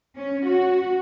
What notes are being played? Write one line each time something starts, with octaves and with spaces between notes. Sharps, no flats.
C#4
F#4